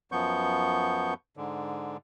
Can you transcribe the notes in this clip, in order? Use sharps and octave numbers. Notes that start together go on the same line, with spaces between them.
F#2 F3 B3 C#6 G6
G#2 D3